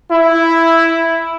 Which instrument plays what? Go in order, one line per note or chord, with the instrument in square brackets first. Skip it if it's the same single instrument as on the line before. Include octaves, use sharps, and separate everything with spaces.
[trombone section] E4